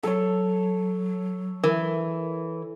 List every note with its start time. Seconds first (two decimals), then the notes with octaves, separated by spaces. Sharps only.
0.03 F#3 A4 C#5
1.64 E3 A#4